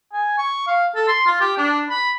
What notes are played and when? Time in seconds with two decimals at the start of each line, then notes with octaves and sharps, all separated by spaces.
0.13 G#5
0.38 C#6
0.67 F5
0.95 A4
1.08 C6
1.26 F4
1.41 G4
1.58 D4
1.90 B5